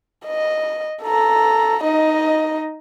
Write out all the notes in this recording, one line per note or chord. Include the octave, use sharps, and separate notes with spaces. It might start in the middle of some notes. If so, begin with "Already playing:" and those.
D#5
A4 A#5
D#4 D#5